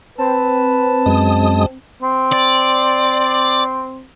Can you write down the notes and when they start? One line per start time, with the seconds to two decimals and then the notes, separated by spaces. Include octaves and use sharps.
0.18 C4 B4 A5
1.06 F#2 G#3 D#6
2.02 C4
2.32 D5